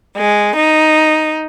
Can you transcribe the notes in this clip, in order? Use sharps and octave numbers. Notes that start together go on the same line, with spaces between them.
G#3
D#4